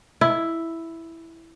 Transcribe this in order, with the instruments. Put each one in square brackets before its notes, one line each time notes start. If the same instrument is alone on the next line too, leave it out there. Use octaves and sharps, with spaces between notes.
[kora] E4